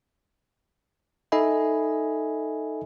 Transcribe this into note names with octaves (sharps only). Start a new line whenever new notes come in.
D#4 A4 D#5 E5 G#5 B5